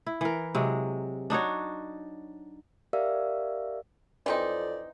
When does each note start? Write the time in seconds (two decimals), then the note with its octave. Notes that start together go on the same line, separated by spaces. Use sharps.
0.06 E4
0.21 E3 A#4
0.54 C3 F#3 G#3
1.30 D4 D#4 F#4 C#5
2.93 G4 A#4 D5 E5 F5 E6
4.26 F2 E3 C4 D#4 D5